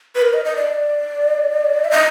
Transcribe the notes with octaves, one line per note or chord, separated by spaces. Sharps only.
B4
A#4
D#5
D#5
D5
E5
D#5